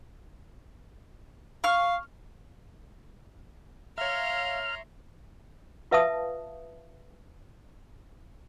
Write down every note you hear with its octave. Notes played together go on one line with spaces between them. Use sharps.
F5 C#6 F6
C#5 E5 F5 A#5 C6 F6
F4 B4 E5 F5 A5 D#6